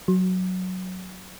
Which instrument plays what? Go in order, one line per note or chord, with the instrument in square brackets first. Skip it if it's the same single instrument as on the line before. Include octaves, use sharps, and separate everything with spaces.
[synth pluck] F#3